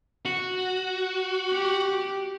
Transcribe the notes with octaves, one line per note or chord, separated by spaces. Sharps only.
F#4
G4